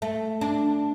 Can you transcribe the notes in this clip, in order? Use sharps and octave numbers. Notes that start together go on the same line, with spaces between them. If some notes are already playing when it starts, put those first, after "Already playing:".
A3
D4